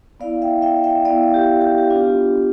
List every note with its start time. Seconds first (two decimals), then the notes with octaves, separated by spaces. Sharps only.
0.20 B3 E4 D5 F5
0.42 E5 G5
0.62 E5 G5
0.84 E5 G5
1.05 B3 E4 D5 F5
1.34 G4
1.61 G4
1.78 G4
1.90 B3 D4 F4